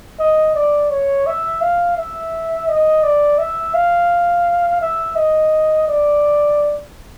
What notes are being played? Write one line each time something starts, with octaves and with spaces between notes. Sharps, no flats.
D#5
D5
C#5
E5
F5
E5
D#5
D5
E5
F5
E5
D#5
D5